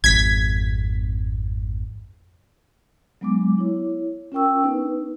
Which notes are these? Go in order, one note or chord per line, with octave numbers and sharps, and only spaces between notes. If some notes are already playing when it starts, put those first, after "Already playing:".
G#1 F2 G#6 B6
F#3 G#3 B3 D4 D6
E4 C#5
C#4 F4 A#4 G5 C#6 E6
B3 D4 D#4 B4